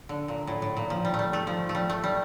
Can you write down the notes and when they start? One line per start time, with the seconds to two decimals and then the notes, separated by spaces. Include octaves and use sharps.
0.09 D3
0.28 A#2
0.47 A2
0.62 A2
0.77 A#2
0.90 F3
1.05 G3
1.14 A3
1.19 G3
1.33 A3
1.47 F3
1.69 A3
1.75 G3
1.90 A3
2.04 G3